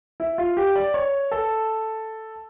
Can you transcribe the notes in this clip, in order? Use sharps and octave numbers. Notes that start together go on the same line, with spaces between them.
E4
F4
G4
D5
C#5
A4